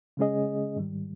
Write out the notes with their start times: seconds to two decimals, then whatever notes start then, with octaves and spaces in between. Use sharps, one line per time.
0.17 C#3 G#3 C#4 G#4 D#5
0.76 G#2 D#3 G3